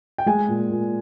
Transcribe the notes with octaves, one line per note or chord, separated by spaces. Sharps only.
G5
G#3 G#5
A#2
A#2